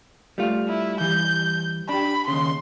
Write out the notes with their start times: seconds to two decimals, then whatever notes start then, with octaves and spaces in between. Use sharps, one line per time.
0.38 G3 A3 F4
0.68 E4
1.01 E3 G3 G6
1.89 D4 G4 B5
2.28 D#2 C#3 C6